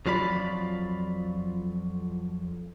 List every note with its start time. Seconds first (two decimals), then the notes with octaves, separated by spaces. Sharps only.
0.06 F2 F#3 F4 D5 B5